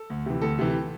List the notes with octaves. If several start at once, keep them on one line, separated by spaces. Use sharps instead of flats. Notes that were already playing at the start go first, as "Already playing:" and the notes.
Already playing: A4
D2
C3 E3
D2 A4
C3 E3